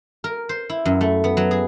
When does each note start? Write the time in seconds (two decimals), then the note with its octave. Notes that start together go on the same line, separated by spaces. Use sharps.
0.24 A#4
0.49 C5
0.70 E4
0.85 F#2
1.01 A3
1.24 B3
1.37 F#3
1.51 G#4